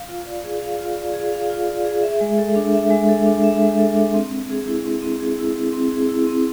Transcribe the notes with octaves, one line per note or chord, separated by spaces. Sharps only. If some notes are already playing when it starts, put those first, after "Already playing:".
Already playing: F5
F4
D5
G#4
F5
F4
D5
G#4
F5
F4
D5
G#4
E5
G#3
A4
D4
E5
G#3
A4
D4
E5
G#3
A4
D4
C4
C4
G#4
E4
C4
C4
G#4
E4
C4
C4
G#4
E4
C4